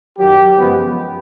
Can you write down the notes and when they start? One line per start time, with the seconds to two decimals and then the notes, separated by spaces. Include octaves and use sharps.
0.19 F#2 D#3 F#3 G4
0.58 F#2 C#3 F3 G#3 B3